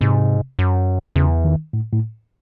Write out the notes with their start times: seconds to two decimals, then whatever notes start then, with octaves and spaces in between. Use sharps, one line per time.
0.01 G#2 C3
0.59 F#2
1.16 E2 C#3
1.45 D#3
1.73 A2
1.93 A2